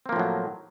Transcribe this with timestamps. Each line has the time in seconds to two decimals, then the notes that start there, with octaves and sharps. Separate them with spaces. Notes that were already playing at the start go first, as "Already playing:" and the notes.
0.06 C4
0.09 A#3
0.13 F3
0.16 A2
0.19 F#3